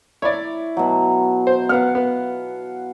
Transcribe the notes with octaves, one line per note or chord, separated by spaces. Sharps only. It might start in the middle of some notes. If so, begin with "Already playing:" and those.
E4 C#5 D5
B2 F#3
C5
B3 F5 F#5 F6
B3